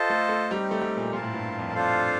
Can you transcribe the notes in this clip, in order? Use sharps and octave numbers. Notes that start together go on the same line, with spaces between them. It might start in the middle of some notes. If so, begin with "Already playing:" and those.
Already playing: F4 A4 C5 D#5 A5
A3
A3
G3 C4 D#4 G4
A3
G3
A#2
A#2 C4 F4 A#4 F5 A5
A2
G2
F2
D4 F4 A4 C5 F5